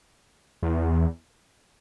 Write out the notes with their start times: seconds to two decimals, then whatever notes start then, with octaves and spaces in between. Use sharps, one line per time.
0.63 E2